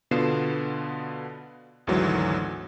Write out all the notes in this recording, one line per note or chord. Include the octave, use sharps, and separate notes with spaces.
B2 D3 B3 F4 C7 E7
G#1 D2 G#2 E3 F#3